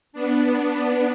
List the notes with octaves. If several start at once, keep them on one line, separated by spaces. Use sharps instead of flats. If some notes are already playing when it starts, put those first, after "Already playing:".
B3 D4